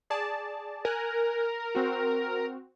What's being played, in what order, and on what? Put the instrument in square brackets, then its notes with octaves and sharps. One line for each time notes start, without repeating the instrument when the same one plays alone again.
[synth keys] G#4 D5 A5
[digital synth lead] A#4 [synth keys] G#5 F#6
[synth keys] C4 F#4